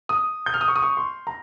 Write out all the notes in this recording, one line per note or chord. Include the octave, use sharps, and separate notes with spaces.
D#6
G6
F6
D#6
C#6
D#6
C#6
C6
A#5